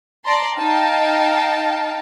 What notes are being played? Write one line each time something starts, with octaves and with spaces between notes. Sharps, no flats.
D5 A5 A#5 C6
D#4 F5 G5 A5